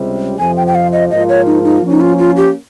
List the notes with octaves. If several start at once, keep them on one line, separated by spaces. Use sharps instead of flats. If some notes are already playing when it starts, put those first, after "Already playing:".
Already playing: C#2 C3 G3
F2 C3 F3 G#5
G5
G5
F5
D#5
G#2 F3 A#3 F4 D#5
C#5
D#4
D#4
F3 A#3 C#4
D#4
F4
F4
G4